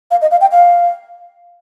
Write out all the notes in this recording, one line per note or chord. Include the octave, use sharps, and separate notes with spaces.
F5
D#5
F5
G5
F5